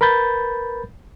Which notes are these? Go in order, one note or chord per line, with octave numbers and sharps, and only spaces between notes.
A#4 B4 B5 G6 A6